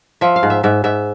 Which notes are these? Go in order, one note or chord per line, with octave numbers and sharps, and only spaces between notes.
F3 E5
F5
G#2
E5
G#2 E5
G#2 E5